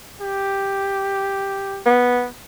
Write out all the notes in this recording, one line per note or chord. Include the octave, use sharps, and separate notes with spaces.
G4
B3